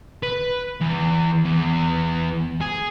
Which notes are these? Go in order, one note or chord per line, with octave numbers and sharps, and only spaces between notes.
B4
E2
E2
G#4